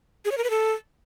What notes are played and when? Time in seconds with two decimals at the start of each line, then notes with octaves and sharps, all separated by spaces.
0.25 G#4
0.31 C#5
0.38 A#4
0.44 B4
0.50 A4